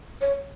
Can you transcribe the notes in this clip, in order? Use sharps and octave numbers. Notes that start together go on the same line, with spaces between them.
C#5